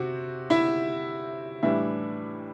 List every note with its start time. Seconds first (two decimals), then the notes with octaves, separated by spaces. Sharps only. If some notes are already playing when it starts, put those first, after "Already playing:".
Already playing: C3 C4 F#4
0.50 E4 E5
1.63 A2 E3 G3 D4 E4 E5